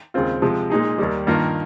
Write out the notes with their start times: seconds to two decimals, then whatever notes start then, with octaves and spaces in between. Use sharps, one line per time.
0.14 D#2 C#3 G#3 C4 F4
0.42 C3 F3 G#3
0.70 A#2 G#3 D#4 G#4
0.98 D#2 D#3 G3
1.27 G2 D#3 A#3 F4 A#4